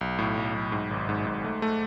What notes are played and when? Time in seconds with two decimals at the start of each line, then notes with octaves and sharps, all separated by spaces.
0.01 B1
0.19 A2
0.37 B1
0.55 B1
0.72 G#2
0.91 G#1
1.09 G#2
1.27 G#2
1.44 A3
1.62 A3